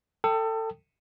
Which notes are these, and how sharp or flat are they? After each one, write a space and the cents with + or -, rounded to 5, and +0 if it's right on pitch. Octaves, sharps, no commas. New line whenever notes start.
A4 +25 G5 +0 D#6 +0